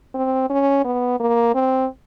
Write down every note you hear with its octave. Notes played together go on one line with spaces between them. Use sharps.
C4
C#4
B3
A#3
C4